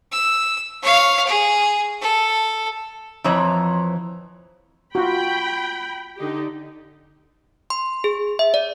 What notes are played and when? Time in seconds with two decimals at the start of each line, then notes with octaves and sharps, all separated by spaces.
0.12 E6
0.83 C#5 F5
1.27 G#4
2.01 A4
3.24 F2 E3 F3 C#5 A#5
4.95 F4 F#4 G5 B5
6.17 D3 D#4 G4
7.70 C6
8.04 G#4
8.39 E5
8.54 D5